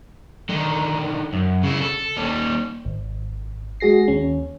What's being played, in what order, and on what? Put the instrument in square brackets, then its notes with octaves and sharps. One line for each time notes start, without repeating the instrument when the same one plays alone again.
[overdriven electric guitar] D3 D#3
F#2
C#3 E4
A4
D#2 G3
[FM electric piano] G#1
G#3 F#4 G#4 A#6 C7
D#2 C#4